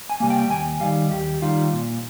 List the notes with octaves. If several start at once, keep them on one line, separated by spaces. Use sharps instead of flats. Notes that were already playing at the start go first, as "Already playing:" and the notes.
G#5
C3 G3 A#3 G#5
G5
D#2 G#5
D#3 G3 F5
D#2 G4
D#3 G3 F4
A#2